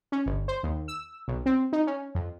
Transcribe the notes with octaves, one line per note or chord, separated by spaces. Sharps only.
C#4
G1
C5
D#2
E6
B1
C4
D#4
C#4
F2